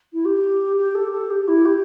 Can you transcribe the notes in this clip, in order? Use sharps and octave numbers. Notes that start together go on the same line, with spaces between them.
E4
G4
G4
A4
A4
G4
E4
G4